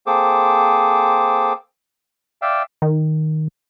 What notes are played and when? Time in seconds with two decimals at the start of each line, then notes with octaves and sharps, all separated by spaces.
0.07 A#3 C4 G#4 A4 C5 D6
2.42 D5 E5 F5 G5
2.82 D#3